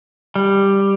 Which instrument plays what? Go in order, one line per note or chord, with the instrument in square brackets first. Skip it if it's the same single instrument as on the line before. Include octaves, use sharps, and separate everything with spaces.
[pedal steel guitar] G3